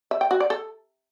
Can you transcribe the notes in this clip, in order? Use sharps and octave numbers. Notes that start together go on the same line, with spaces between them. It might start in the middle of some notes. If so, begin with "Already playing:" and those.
E5
G5
F#4
D5
A4